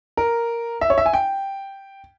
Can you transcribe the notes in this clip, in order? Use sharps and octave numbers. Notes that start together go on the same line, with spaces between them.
A#4
E5
C#5
E5
G#5
G5